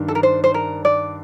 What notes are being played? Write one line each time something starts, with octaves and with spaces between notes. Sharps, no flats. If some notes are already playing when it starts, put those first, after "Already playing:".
Already playing: G2 D#3 D4
A4
A#4
C5
C5
A#4
D5